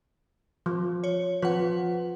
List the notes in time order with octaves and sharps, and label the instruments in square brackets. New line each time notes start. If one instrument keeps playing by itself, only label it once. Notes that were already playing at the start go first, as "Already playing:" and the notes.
[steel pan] F3
[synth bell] C#5
[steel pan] F3 [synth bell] B4 F#5